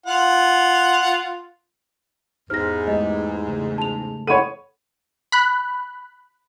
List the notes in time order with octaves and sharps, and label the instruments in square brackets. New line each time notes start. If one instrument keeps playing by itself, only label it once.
[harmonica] F4 F#5
[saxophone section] E2 G#2 [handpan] D#4 G4 C5 [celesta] F6 A#6
[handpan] G#3 A3 G4 [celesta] D#5
[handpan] C#3 A3
[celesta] A5 F7
[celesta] A4 F#5 B5 [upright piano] C#5 D#7
[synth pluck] B5 F#6